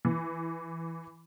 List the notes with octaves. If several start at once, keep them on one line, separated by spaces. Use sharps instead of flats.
E3